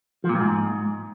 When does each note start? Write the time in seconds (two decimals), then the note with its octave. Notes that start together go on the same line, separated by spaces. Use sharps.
0.24 F3
0.29 A#2
0.35 G2
0.40 G#2